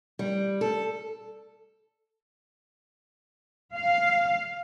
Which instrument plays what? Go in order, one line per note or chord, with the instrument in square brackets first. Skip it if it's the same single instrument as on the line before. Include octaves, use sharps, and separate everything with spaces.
[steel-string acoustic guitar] G3
A4
[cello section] F5